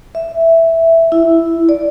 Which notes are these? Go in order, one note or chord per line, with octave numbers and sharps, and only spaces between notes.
E5
E4
D5